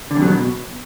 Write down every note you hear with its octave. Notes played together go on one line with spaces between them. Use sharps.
D3
F2
F#3
B2